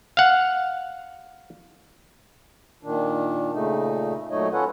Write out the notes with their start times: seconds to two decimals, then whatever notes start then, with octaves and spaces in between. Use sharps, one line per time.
0.17 F5 F#5
2.83 A#2 D#3 D4
3.53 A#2 C#3 A3 D#4
4.31 A#2 F#3 A3 D#4 C#5 D#5
4.53 C#4 F4 A4 B4 C#5 F#5